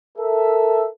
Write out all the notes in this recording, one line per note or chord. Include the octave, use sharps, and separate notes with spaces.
A4 A#4 E5